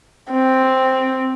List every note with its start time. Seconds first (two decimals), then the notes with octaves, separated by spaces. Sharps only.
0.31 C4